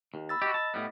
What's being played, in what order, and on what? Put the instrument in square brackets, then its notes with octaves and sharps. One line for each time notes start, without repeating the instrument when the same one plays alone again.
[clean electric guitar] D#2
[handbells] B5 E6 A6
[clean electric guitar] F#4 G4 [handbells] D#5
[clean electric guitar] A5
A2 G3 B3